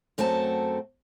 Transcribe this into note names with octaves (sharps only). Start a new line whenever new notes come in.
F#2 A3 C4 F#4 A5